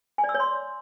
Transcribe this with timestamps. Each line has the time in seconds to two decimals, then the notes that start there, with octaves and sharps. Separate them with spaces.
0.18 G#5
0.24 D5
0.29 E6
0.34 C#5
0.40 C6